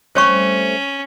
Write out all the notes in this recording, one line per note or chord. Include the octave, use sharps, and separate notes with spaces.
G3 A3 C4 C#4 C5 C#5 C#6